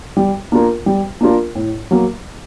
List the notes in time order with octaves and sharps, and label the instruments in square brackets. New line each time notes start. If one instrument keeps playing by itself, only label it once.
[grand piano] G3
A#3 D4 F4 A#4
G3
A#3 D4 F4 A#4
A2
F#3 A#3